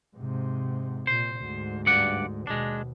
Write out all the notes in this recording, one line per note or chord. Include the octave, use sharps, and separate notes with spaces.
G#2 C3
A#2 C5
D2 G#2
G2 D5 F#5
D#2 B2 G#3 D4